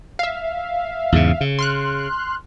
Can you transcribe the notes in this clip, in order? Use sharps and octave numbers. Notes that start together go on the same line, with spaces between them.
E5 F5
E2 G#2 C#3
C#3
C6 F6 F#6